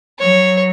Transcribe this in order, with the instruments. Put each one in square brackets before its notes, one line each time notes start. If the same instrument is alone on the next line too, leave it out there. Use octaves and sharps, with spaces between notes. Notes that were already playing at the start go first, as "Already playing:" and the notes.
[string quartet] F#3 [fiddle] C#5